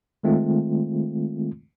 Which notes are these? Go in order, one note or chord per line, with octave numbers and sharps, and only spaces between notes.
D#3 G#3 A3 C4 F4